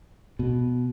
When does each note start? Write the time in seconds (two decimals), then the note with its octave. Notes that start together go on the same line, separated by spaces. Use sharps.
0.39 B2